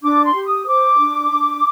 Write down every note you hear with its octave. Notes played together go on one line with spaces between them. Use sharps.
D4 D6
C6
G4
D#6
C5 D6
D4
D4